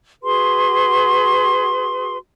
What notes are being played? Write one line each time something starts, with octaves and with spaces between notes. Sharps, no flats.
F#4 G#4 B4 C6